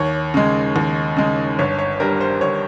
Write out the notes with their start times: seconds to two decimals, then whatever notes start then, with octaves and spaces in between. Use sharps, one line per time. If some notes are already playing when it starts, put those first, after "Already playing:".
Already playing: D#2 C#5
0.34 C#3 G#3
0.76 D#2
1.17 C#3 G#3
1.59 G1 C#5
1.79 C#5
2.00 G2 G3 A#4
2.20 C5
2.41 G1 C#5